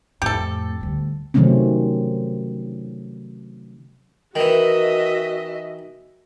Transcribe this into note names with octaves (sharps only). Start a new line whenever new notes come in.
F2 A2 G4 A4
D2 G3
C3 D#3 F#3 A3 C4 C#4
D#3 E3 F#4 D#5 E5